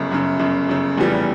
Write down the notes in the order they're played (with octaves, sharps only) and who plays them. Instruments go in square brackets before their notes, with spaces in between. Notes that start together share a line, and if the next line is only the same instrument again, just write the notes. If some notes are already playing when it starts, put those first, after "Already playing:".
Already playing: [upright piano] G1 F#2 C#3
G1 F#2 C#3
G1 F#2 C#3
G1 F#2 C#3
F1 E2 C#3 E3 G3